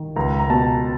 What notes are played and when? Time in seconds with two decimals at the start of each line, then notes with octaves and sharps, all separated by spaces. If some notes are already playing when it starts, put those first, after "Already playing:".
Already playing: D#3
0.16 C#2 A#5
0.39 A#5
0.50 B2 A5